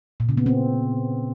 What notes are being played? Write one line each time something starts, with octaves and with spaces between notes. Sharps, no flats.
A#2
C#3
B3
C4